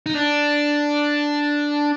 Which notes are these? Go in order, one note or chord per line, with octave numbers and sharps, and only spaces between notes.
D#4
D4